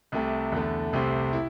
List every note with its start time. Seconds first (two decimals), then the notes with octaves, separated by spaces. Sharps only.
0.12 C2 C3 A3
0.52 E2 D3 A3
0.93 C2 C3 A3 C4
1.33 E4